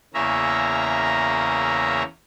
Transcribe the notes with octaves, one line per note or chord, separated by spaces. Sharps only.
E2 C#3 A#3 C#4 E5 A#5